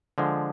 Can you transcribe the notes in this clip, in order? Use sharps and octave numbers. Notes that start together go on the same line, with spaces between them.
D3 F3 G#3